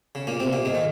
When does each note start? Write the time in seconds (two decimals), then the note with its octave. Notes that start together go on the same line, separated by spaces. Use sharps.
0.15 C#3
0.27 A#2 A#3
0.40 C3 C4
0.53 A#2 A#3
0.65 G#2 G#3
0.75 D#3